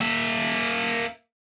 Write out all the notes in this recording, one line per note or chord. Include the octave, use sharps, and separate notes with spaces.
A#3 E5